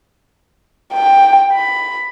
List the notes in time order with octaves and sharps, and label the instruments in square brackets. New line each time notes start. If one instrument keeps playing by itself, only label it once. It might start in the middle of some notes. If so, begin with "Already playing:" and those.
[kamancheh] G5
B5